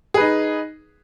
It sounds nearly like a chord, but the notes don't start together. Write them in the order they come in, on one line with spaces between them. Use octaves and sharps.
G#4 B4 D#4